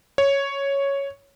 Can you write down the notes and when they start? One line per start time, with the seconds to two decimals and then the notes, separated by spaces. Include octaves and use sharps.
0.18 C#5